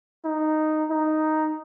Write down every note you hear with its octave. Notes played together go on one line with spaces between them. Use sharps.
D#4
D#4